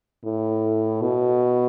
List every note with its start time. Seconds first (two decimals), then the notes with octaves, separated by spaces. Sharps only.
0.24 A2
1.01 B2